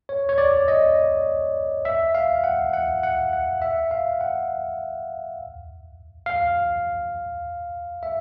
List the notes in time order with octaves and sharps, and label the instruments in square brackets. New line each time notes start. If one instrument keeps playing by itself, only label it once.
[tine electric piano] C#5
C#5
D5
D#5
E5
F5
F#5
F#5
F#5
F#5
E5
F5
F#5
F5
E5